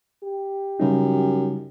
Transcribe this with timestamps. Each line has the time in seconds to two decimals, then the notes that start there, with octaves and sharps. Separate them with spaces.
0.23 G4
0.80 F#2 C#3 G3 D#4